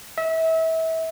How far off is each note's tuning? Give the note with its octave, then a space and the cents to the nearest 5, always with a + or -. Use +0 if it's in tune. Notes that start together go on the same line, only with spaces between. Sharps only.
E5 -30